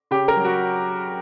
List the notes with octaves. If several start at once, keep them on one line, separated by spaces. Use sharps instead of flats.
C#3 G4
A#4
F#3
F#4